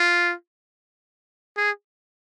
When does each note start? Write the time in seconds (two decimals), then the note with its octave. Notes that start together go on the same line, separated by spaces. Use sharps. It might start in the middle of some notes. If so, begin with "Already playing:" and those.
Already playing: F4
1.57 G#4